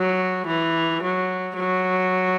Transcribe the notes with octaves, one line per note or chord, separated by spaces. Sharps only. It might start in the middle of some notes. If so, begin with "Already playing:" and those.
Already playing: F#3
E3
F#3
F#3